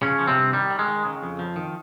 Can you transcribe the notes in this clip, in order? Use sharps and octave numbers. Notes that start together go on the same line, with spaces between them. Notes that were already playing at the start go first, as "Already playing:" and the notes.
C#3 F3 C#4
F3
C3 C4
G2
D#3 G3
D#3
G#3
D#3
C#3
F2
F3
D#3